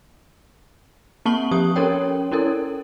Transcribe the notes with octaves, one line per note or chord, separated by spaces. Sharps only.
A#3 C4 A5 C#6 F#7 G7
F3 G4 D#6
C#4 A4 A#4 C#5 G5
C#4 E4 A4 A#4